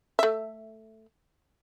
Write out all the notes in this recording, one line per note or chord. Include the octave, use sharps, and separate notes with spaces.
A3 E5